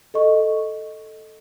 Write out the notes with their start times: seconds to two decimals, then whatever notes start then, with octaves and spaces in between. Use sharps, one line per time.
0.14 A4 D#5 C#6